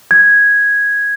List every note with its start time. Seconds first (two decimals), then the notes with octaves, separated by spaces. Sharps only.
0.11 G#6